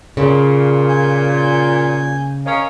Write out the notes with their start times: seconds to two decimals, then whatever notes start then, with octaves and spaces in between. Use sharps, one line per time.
0.17 A#2 C#3
0.88 G#5 G6
2.46 C#4 A#4 D#5 F5